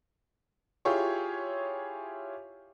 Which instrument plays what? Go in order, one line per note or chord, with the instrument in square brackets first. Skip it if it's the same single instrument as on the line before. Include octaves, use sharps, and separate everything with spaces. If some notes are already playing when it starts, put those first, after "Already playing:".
[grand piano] E4 F4 G4 G#4 C#5 C#6